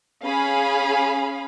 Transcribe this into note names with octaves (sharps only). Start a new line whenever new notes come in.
C#4 G#4 F5 B5